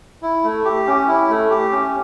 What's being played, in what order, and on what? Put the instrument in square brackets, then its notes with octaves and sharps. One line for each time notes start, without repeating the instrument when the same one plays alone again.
[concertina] E4
A3
G4
C#4
E4
A3
G4
C#4